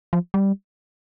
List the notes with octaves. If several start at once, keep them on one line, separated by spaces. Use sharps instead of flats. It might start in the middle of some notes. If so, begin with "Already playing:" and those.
F3
G3